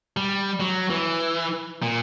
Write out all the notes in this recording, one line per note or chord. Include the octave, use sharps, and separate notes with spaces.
G3
F#3
E3
A#2